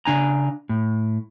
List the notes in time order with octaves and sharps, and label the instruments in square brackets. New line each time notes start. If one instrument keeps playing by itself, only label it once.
[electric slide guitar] C#3 D4 G#5 A#5
A2